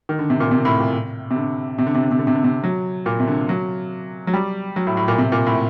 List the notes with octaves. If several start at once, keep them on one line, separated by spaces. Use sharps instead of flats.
D#3
D3
C3
A#2
C3
A2
A#2
C3
D3
C3
D3
C3
D3
C3
D3
C3
D3
C3
F#3
A#2
C3
D3
F#3
F#3
G3
F#3
A2
A2
A#2
C3
A#2
A2